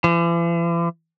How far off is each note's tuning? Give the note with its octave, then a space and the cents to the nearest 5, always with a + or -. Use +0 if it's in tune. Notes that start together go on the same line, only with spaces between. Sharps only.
E3 +45